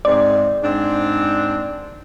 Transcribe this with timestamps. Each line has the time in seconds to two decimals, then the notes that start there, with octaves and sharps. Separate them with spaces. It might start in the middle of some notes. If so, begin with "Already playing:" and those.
0.05 G#2 C4 D5
0.63 G#2 C4 D4